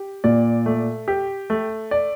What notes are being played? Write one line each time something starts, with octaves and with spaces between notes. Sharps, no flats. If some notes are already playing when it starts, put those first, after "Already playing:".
Already playing: G4
A#2 D5
A3
G4
A3
D5